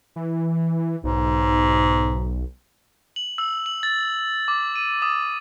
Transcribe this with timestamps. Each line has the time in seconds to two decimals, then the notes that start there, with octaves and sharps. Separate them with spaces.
0.16 E3
1.04 B1 G#2
3.16 F#7
3.38 E6
3.66 F#7
3.83 A6
4.48 D6
4.76 D#7
5.02 D#6